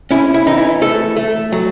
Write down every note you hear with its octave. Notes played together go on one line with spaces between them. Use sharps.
C#4 E4
E4
E3 D#4
E4
A3 A4
A3
F#3